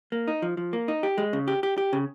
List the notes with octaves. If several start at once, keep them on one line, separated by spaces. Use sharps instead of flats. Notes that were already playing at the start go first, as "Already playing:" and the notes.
A#3
D#4
F3
F3
A#3
D#4
G4
G#3
C#3
G4
G4
G4
C#3